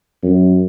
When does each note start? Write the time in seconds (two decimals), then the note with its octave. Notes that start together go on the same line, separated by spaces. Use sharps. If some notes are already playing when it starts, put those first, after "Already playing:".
0.23 F#2